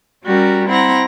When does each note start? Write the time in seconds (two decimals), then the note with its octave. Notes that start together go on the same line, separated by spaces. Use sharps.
0.25 G3 C#4 F#4 G4 A#4
0.68 C4 E4 F#5 A#5